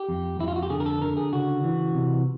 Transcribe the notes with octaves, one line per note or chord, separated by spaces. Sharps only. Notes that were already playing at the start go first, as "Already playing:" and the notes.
Already playing: G4
F2
F2 E4
F4
F#4
G4
D3 G#4
A#4
A4
D3 A#4
G#4
C#3 F#4
E3
C3